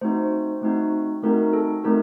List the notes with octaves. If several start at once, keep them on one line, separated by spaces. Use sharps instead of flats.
A3 C4 D#4 F#4 C5
A3 C4 D#4 F#4
A3 C4 D#4 F#4 A#4
A4
A3 C4 D#4 F#4 A#4